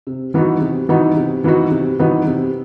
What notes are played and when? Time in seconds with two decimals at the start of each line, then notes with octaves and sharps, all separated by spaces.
0.07 C3
0.34 E3 B3 D#4 F#4
0.61 C3
0.89 E3 B3 D#4 F#4
1.17 C3
1.44 E3 B3 D#4 F#4
1.71 C3
1.99 E3 B3 D#4 F#4
2.26 C3